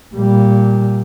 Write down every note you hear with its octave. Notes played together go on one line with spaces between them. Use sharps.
A#2 G3